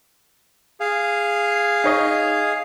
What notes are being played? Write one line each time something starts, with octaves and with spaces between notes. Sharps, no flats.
G#4 F5
D#4 C#5 D#5